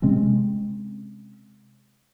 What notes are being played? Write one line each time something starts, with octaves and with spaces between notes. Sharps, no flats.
C3 G#3 C4 C#4